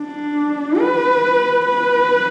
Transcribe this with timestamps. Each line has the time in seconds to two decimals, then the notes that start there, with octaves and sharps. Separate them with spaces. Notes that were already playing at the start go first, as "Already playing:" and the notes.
Already playing: D4
0.79 B4
1.66 B4